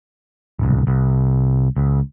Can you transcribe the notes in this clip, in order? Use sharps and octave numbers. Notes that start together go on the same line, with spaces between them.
D1 C2
C2
C#2